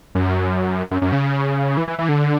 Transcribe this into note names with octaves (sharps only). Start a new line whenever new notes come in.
F#2
F#2
F#2
C#3
E3
E3
E3
D3